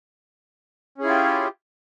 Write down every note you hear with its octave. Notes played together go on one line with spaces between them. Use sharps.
C#4 E4 F4 G4 G#4